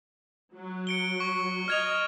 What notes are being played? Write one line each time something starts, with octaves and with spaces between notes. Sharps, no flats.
F#3
C#7 D7 G7
C#6
D#5 F6 G#6 F7